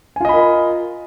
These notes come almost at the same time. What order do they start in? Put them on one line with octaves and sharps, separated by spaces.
G#5 F4 D#5 B5 A#4